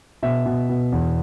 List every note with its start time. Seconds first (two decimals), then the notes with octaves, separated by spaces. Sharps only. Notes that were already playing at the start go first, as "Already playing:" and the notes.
0.23 B2 E5
0.46 B2
0.69 B2
0.92 E2